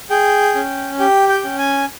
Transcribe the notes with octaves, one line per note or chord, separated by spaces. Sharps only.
G#4 G5
C#4
G4 G5
G5
C#4
G#5